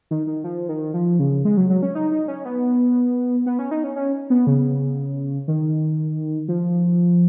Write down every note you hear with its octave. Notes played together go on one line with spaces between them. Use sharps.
D#3
D#3
F3
D#3
F3
C#3
G#3
F#3
F#3
C#4
D#4
D#4
C#4
B3
B3
C#4
D#4
C#4
C#4
B3
C#3
D#3
F3